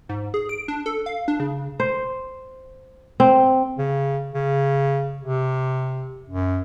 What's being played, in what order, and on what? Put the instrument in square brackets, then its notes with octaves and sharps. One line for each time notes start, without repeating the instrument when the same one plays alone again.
[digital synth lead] G#2
G#4
D7
D4
A4
F5
D4
C#3
[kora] C5
C4
[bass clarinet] C#3
C#3
C3
F#2